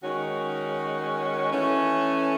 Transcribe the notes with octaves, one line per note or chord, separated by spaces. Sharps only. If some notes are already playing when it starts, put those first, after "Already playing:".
D#3 G#3 C#4 F#4 C#5
E3 A3 C#4